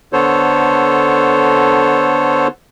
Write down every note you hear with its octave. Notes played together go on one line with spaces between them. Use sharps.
D3 B3 A4 C5 C#5